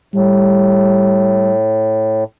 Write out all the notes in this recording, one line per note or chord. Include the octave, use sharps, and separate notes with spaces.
A2 G3